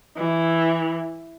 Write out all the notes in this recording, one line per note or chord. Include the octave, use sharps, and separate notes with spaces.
E3